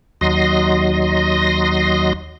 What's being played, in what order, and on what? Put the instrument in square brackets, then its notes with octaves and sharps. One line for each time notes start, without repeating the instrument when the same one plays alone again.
[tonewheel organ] D#2 F#3 D#5 C6 A#6